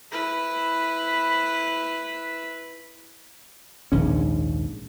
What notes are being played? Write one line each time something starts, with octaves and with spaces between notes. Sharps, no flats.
E4 B4
A#1 D#2 G#2 C#4